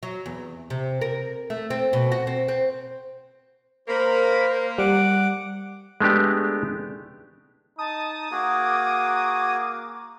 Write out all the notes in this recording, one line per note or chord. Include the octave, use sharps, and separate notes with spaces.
F#3
E2
C3
A#4
A3
C4
B2
F#4
C4
C4
A#3 A#4 C5 B5
G3 F#5 D6
G#3 A3 B3 D4 G4
D#4 A5 D#6
A#3 F#4 G#4 D6